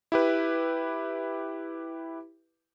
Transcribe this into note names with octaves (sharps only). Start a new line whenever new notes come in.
E4 G4 B4